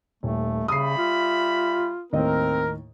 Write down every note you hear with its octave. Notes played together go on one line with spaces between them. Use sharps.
D#1 A3
C#3 G3 E5 B5 D#6 C7
F4
D#2 A2 C4 A#4 D#5